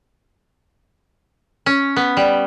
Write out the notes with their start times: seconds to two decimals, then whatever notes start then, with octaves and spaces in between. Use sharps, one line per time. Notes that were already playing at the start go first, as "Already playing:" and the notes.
1.66 C#4
1.96 B3
2.17 G3